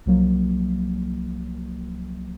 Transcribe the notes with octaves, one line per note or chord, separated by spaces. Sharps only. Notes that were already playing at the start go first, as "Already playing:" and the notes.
C2 F3 F#3 A#3